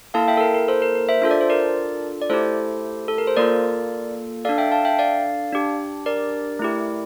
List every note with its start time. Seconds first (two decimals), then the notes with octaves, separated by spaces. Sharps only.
0.14 A#3 E4 A4 F5 A5
0.28 E5 G5
0.37 A4
0.41 A#4
0.54 A#4
0.68 A4 C5
0.82 A#4
0.95 A#4
1.09 C5 E5
1.22 D4 F4 A4 E5
1.31 D5
1.41 C5
1.50 A#4 D5
2.22 D5
2.29 A3 E4 G4 A4 C5
3.08 A4
3.18 A#4
3.27 C5
3.37 A#3 F4 A4 A#4 D5
4.45 D4 A4 D5 F5
4.58 E5 G5
4.72 F5 A5
4.85 E5 G5
4.99 D5 F5
5.53 D4 G4
6.06 A#4 D5
6.59 A3 E4 G4